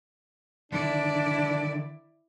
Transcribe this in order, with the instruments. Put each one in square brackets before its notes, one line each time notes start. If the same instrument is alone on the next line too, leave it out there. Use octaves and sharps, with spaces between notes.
[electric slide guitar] D3 D#3 [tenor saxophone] D4 [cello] E4 D5